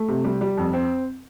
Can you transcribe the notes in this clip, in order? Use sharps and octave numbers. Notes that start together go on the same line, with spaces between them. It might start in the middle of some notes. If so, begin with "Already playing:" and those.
Already playing: A3
C3
G3
G3
F2
C4